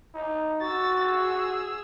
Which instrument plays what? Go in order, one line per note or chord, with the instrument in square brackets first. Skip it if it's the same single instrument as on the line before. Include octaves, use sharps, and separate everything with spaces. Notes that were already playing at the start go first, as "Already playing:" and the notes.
[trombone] D#4
[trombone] F#4 [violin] E6 A6
[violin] G#4 E6